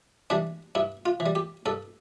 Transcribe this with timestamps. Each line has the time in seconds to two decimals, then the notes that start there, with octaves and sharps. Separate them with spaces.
0.30 E3 G3 D4
0.75 G2 E4
1.06 F4
1.20 E3
1.26 G3
1.35 G4
1.66 G2 A4